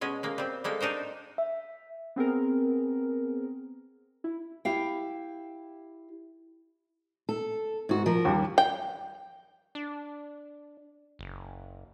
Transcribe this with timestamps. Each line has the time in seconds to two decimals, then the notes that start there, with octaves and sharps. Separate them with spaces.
0.01 B2 G#3 C#4
0.23 G#3 A#3
0.38 G3 C4
0.64 G3 G#3 A#3 A4
0.81 D4 D#4 A#4 C5
1.38 E5
2.16 B3 C4 G#4 A#4
4.24 E4
4.65 E4 G4 F5 G5
7.29 A4
7.89 G#2 F#4
8.06 F3 A#4
8.25 D#2 G3
8.58 G5
9.75 D4
11.19 F#1